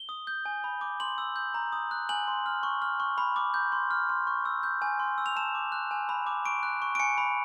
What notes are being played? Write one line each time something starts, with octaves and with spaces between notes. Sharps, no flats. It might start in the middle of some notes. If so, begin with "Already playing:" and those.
Already playing: G7
D#6
G6
G#5
B5
D6
C6 F#7
E6
G6
A#5
D#6
F#6
G#5 F#7
C6
F6
C#6
F6
C#6
B5
D6
G6
C6
F6
C6
C#6
E6
G6
G#5
C6
E6
F7
A5 E7
D6
F#6
G#5
B5
D6
C#6 D7
F#6
C#6
D7
G#5 C#7
B5